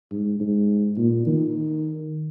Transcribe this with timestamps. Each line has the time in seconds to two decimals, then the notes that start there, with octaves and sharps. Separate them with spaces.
0.11 G#2
0.40 G#2
0.97 A#2
1.26 D#3